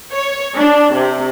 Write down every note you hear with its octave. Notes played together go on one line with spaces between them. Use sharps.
C#5
D4
C3